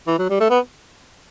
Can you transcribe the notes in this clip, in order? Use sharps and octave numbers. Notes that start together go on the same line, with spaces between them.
E3
F#3
G3
A3
B3